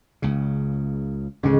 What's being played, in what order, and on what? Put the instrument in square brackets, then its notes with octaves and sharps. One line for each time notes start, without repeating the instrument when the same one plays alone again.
[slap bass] C#2 C#3
[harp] C#2 C#4 [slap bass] G#2 D3